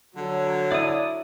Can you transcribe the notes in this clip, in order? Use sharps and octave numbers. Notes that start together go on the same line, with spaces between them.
D3 F#3
E4 D5 D#6